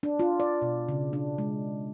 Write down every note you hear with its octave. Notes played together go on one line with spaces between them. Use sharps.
D4
F4
D5
B2
C#3
D4
G#3